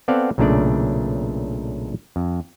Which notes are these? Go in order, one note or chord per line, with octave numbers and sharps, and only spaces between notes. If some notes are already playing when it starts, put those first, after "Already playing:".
B3 C4 A4 D5 F5 F#5
B1 A#2 C#3 A3 D4 D5
F2